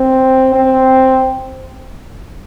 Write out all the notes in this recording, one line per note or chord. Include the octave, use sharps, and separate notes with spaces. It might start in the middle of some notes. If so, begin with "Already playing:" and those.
Already playing: C4
C4